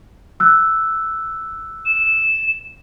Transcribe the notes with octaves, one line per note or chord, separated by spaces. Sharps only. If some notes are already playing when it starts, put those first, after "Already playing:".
E6 F#6
E7